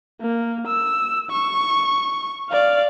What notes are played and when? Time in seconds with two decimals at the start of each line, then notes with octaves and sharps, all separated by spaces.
0.21 A#3
0.67 E6
1.31 C#6
2.50 D5 F5